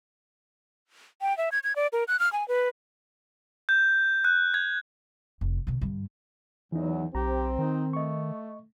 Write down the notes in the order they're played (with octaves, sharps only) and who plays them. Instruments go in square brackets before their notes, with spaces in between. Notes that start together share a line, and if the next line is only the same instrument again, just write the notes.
[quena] G5
E5
G#6
G#6
D5
A#4
F#6
F6
G#5
B4
[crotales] G6
F#6
G#6
[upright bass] F1
B2 D3
G2 D3
[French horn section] E2 [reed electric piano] E3 D#4 [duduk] F#3
[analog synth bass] B1 [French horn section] C4 [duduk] G4 [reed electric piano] A#5
[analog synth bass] D#3 [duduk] D#4
[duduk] A3 [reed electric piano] D#5 C#6